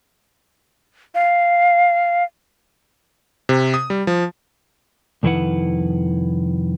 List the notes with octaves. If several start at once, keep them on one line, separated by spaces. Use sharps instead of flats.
F5
C3
D#6
G3
F3
C2 F2 D#3 E4 B4 F#5